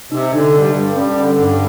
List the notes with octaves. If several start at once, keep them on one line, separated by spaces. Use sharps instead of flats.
C3 D#4
D3 D4
G2
G2
G3 C#4
D3
G2